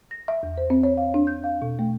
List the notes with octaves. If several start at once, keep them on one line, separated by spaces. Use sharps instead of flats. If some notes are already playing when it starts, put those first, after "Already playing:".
A#6
E5
E2
C5
C4
C#5
F5
D4
G6
F5
B2
A3